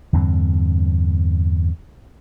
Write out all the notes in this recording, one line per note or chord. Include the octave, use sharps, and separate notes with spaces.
E2 G2 D3 C4